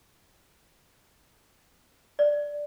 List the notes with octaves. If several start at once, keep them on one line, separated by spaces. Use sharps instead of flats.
D5